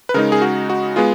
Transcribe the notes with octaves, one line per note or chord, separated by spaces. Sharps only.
B4
C#3 G#3 D#4 A#4
G#4
F#4
F#4
G#3 B3 F4 G#4